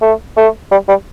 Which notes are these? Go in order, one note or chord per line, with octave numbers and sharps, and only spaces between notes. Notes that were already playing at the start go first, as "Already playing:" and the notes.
A3
A3
G3
G3